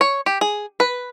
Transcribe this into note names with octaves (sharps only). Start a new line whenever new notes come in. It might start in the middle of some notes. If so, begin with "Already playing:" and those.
C#5
G4
G#4
B4